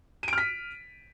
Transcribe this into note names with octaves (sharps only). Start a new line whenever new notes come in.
F6 B6 D7 D#7